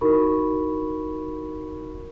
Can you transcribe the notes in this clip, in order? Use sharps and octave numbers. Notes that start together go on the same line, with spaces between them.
D#4 E4 F#4 A#4 B5 C#6